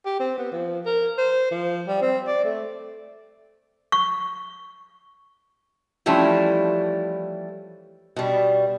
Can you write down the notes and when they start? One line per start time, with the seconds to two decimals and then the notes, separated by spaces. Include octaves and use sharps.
0.06 G4
0.20 C4
0.38 B3
0.52 F3
0.86 A#4
1.18 C5
1.51 F3
1.87 G3
2.02 C4
2.27 D5
2.44 A3
3.92 C#6
6.06 E3 F3 G3 A3 C#4 E4
8.16 B2 G3